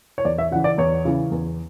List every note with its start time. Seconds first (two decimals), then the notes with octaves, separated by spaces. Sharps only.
0.18 C#5
0.25 E2 D5
0.38 E5
0.51 C#3 F#5
0.55 E3
0.64 D5
0.78 E2 C#5
1.05 C#3 E3
1.31 E2